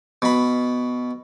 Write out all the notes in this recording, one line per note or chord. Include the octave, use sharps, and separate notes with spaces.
B2 B5